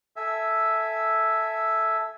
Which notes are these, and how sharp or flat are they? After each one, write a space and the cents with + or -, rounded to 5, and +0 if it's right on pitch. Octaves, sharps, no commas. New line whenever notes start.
A4 +0 E5 +0 G#5 +0